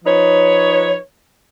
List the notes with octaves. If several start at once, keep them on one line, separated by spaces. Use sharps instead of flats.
F3 D#4 B4 C#5